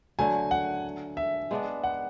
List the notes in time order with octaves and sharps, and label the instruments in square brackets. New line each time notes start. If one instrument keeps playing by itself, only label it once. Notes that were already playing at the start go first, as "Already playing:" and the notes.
[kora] D3 F#3 A3 [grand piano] G#5
[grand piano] F#5
E5
[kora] G#3 B3 D4
[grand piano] F#5